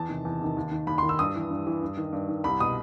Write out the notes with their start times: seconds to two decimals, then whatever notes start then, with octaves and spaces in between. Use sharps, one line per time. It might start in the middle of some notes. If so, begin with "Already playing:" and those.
Already playing: E2 A5
0.09 C3 D#3
0.25 E2
0.41 C3 D#3
0.57 D#2
0.71 D#3
0.87 D#2 B5
0.98 D#3 C6
1.09 E6
1.19 G2 D#6
1.35 E3
1.51 G2
1.67 E3
1.82 G2
1.97 D#3
2.13 G2
2.29 D#3
2.44 C2 B5
2.60 B2 D#6